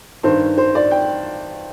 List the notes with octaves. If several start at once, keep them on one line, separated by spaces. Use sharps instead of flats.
G2 D#3 C5
C5
D5
G5